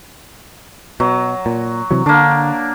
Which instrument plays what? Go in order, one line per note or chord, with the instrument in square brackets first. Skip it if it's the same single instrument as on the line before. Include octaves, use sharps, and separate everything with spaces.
[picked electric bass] B2 [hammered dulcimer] F#3
[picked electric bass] A#2
C3 E3 F#3
[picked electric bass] D3 [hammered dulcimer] A#3 D4